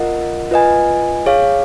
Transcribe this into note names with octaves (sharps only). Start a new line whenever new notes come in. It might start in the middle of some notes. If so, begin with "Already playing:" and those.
Already playing: F4 A#4 D#5 F#5
F4 B4 D#5 G#5
G#4 C#5 F5